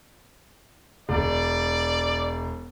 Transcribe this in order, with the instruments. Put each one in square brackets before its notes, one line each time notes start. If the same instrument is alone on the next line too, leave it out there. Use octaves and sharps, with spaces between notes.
[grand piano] E1 [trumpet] D5